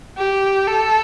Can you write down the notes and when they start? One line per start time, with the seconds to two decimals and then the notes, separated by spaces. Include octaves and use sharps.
0.18 G4
0.67 A4